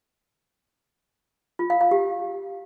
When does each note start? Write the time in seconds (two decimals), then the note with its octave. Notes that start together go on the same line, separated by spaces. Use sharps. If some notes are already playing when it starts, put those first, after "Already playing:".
1.59 F4
1.70 F5
1.81 F5
1.91 G4